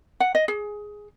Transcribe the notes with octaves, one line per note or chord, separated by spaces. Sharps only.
F#5
D#5
G#4